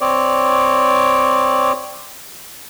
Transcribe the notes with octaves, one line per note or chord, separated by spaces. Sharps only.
C4 C#5 D5